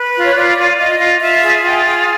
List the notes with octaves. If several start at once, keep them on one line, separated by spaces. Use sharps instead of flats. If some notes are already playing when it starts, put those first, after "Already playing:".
Already playing: B4
F4
C#5
F4 D5
F4
F4 D#5
F4
F4 E5
G#4
F4 G5
G#4